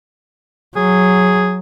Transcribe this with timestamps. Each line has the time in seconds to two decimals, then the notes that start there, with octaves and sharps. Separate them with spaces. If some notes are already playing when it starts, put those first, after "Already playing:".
0.76 F#3 G#4